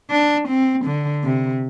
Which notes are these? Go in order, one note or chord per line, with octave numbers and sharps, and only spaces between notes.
D4
C4
D3
C3